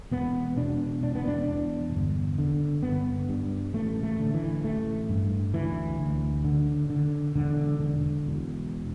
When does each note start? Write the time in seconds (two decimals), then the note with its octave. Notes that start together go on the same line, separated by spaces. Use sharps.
0.11 E1 B3
0.57 B2 D4
1.03 E1 D4
1.15 B3
1.28 D4
1.48 E2
1.93 G1
2.38 D3
2.83 G1 B3
3.29 G2
3.73 A1 A3
4.03 A3
4.19 D3
4.34 E3
4.64 A1 A3
5.09 G2
5.54 D2 E3
5.99 D2
6.45 D3
6.90 D3
7.35 E1 D3
7.80 D3
8.26 E1